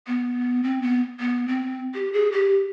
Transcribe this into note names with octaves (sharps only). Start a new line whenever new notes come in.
B3
C4
B3
B3
C4
G4
G#4
G4